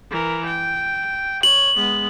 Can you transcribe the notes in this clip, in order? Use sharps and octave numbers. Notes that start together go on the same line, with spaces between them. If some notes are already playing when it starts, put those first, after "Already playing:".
E3 A#4
G5
C#5 F#7
G#3 B3